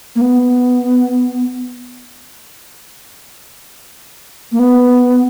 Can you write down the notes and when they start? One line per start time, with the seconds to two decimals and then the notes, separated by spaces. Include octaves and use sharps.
0.16 A#3
0.21 B3
4.52 A#3
4.59 B3